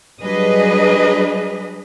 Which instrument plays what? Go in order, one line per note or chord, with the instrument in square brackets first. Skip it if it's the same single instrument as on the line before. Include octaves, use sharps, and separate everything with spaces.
[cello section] F#3 G3 D4 G#4 B4 D#5